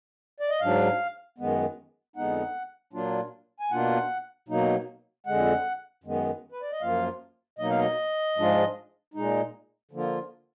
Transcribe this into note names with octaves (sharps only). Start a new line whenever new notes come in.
D5
D#5
G#2 F#3 D4 F5
F#2 D#3 G#3 B3
F2 D3 G#3 B3 D#4 F#5
A#2 F#3 A#3 D4 F4
G#5
B2 A#3 D4 F4 F#5
B2 F#3 A#3 D#4
F2 D3 G#3 F#5
F#2 D#3 G#3 B3
B4
D5
D#5
F#2 F3 A#3 F4 F5
B2 F#3 A#3 D#4 D#5
F5
D#5
G#2 F3 G#3 D4 F4
A#2 G#3 D#4
D3 F3 A#3 F4